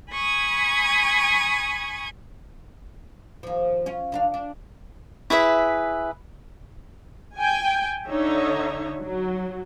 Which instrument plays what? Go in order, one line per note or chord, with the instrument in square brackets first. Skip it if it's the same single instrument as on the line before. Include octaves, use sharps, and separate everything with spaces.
[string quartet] G#5 B5 C#6 D#6 G#6
[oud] D#2 F3
C#4 F4
D#2 D4 F5
D4
[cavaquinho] E4 G#4 B4 E5
[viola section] G5 G#5
D3 D#4 C#5 E5
F#3